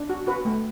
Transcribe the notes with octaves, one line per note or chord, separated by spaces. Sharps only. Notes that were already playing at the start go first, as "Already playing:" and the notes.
Already playing: D4
F#4
F#4 B4
A3